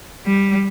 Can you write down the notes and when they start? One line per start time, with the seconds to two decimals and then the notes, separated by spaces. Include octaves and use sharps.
0.26 G3